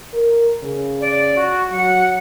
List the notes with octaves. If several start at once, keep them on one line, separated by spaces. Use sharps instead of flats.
A#4
C#3
D5
F#4
F#3 F#5